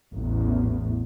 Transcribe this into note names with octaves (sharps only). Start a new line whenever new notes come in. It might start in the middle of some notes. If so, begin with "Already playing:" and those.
A1 E2